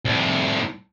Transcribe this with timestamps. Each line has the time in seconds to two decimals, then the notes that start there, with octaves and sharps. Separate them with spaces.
0.05 C2 A2